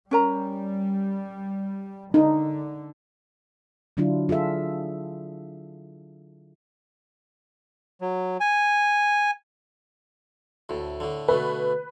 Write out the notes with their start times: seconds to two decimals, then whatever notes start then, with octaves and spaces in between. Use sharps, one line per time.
0.11 G3 C#4 A#4 A#5
2.14 D3 D#4
3.97 D3 F#3 D4 E4 F4
4.29 F4 G#4 A4 E5
8.01 F#3
8.40 G#5
10.69 D2 A2
11.00 A2 D3
11.28 B2 D3 A3 B4